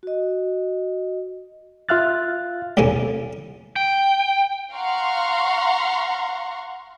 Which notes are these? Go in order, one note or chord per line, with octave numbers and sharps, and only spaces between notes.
F#4 D#5
F4 E5 F5 F6 F#6 A6
D#2 A2 C3 A#3 C#4
G5
F5 F#5 A#5 C6 C#6